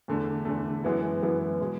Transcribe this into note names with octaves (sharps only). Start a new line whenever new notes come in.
E2 D3 A3
E2 D3 A3
F#2 E3 G#3 B3 E4
F#2 E3 G#3 B3 E4
B2 G#3